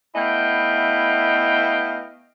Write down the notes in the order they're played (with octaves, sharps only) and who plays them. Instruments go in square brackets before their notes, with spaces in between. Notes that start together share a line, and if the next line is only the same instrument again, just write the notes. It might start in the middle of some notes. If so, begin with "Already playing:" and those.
[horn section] A3 B3 E4 D#5 F5 G5